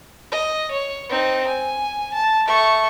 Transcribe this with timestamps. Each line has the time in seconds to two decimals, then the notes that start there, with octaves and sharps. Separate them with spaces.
0.31 D#5
0.71 C#5
1.09 C4 D#4
1.47 G#5
2.14 A5
2.47 A3 C#6